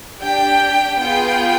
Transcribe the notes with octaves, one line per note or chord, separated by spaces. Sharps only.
D4 G4 G5
B3 F4 G#4 G5